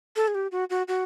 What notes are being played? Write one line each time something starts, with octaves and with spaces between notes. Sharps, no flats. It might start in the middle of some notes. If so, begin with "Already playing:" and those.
A4
G#4
G4
F#4
F#4
F#4